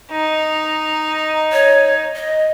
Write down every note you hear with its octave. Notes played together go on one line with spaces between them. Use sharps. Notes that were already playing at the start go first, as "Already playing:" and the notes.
D#4
C#5
D#5